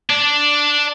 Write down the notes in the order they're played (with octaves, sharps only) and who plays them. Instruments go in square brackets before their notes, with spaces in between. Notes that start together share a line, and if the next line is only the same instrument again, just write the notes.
[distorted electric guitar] D4